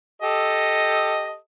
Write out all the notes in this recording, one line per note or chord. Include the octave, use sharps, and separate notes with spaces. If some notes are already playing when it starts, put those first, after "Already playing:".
G4 A4 D#5